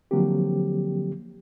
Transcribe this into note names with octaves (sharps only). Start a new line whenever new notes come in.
D3 F3 F#3 A#3 C4 G4